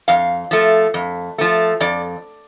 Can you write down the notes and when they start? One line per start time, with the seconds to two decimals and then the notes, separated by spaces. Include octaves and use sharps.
0.08 F2 F5
0.51 F3 A3
0.94 F2
1.38 F3 A3
1.80 F2 D5